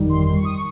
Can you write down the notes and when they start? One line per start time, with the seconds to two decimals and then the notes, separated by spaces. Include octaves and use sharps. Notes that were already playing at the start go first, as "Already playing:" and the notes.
Already playing: G1 F2 D#3 G3
0.09 C6
0.26 C6
0.36 C#6
0.45 D#6
0.53 C#6